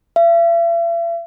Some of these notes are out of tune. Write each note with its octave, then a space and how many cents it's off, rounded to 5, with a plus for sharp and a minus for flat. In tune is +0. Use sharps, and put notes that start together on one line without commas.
E5 +45